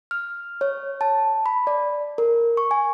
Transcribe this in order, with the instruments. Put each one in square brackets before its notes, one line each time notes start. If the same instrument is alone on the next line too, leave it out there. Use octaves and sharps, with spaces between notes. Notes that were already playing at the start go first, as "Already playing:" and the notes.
[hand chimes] F6
C#5
A5
B5
D5
A#4
C#6
G#5